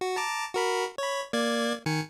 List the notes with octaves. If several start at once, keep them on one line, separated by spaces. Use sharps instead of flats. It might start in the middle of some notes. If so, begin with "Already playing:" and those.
F#4
A5 A#5 D6
F#4 A#4 B5
C#5 B5
A#3 D5 G#6
D#3 G#5 C#7